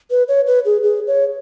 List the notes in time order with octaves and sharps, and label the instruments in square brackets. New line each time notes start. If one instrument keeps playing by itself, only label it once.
[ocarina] B4
C#5
B4
G#4
G#4
C#5